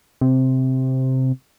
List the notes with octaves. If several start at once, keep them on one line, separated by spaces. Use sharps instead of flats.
C3